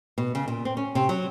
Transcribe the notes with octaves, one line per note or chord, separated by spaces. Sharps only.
B2
C#3
A#2
C4
C#4
C3
F#3